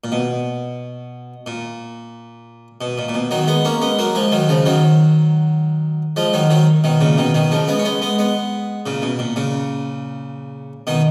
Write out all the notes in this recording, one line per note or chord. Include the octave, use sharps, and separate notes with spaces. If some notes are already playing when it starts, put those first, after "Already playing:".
A#2
B2
A#2
B2
A#2
A#2
B2
D#3 F#3
G#3 B3
A#3 C#4
G#3 B3
F#3 A#3
F3 G#3
D#3 F#3
C#3 F3
D#3 F#3
F3 G#3
D#3 F#3
D#3 F#3
B2 D#3
A#2 C#3
B2 D#3
B2 D#3
C#3 F3
G#3 B3
C#4
G#3 B3
G#3 B3
G#3 B3
A#2 C#3
B2
A#2
A#2 C#3
B2 D#3